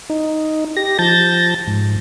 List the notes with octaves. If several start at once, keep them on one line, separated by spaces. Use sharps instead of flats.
D#4
G4 A#6
F3 A5 G6 A6 A#6
G#2